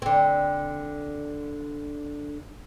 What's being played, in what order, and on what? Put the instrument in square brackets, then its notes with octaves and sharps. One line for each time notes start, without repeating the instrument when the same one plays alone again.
[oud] D3 C4